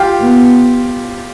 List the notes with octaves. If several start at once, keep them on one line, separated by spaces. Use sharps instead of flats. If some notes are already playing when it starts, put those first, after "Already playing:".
Already playing: F4 G4
B3